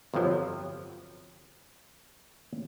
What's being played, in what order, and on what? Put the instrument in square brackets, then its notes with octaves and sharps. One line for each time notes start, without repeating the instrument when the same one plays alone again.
[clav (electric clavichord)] G1 F2 C3 F3 F#3